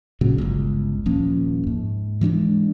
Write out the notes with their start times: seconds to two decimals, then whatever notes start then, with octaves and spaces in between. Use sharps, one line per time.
0.21 A#2 C#3 F#3
0.38 G1 C#2
1.06 D#1 F3 A#3 C#4
1.67 G#2
2.21 E3 G#3 C#4 D4